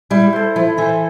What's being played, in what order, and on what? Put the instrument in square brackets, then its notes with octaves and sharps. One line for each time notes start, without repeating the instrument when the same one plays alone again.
[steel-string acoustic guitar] G3 [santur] E4
[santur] A4 C5
[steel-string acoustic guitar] F3 [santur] E4
[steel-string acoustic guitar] E3 [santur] A4 C5